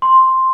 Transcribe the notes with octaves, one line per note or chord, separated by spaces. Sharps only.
C6